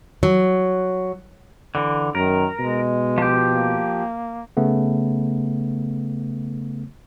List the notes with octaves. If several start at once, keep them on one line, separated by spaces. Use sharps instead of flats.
F#3
D3 E3
F#2 D#3 A#4
B2 G#3
F3 G4
A#3
C#3 A3 B3